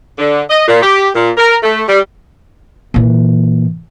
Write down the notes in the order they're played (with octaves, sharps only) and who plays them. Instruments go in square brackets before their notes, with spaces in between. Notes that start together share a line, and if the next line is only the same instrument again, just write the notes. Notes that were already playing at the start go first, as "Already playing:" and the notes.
[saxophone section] D3
D#5
A#2
G4
A#2
A#4
A3
G3
[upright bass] A#2 E3